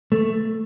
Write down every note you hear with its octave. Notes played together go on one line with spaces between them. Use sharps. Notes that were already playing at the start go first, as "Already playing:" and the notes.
A3